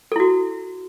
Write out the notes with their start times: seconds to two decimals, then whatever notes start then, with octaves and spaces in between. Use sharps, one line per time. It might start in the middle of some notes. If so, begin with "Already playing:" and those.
0.12 A4
0.16 E4
0.20 F#4